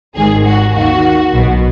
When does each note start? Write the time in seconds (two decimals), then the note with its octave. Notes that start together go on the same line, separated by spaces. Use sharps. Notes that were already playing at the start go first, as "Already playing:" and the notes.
0.15 G#1 G#2 D#3 G#4
0.44 F#4
0.74 D#2 D#3 F#4
1.33 B1 B2